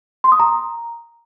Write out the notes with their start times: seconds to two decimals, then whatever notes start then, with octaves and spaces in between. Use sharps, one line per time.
0.24 C6
0.32 D#6
0.40 A#5